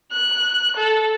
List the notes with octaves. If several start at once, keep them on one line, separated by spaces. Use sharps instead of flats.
F#6
A4